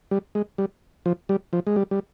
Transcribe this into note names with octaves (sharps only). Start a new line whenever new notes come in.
G3
G#3
G3
F3
G3
F3
G#3
G3
G3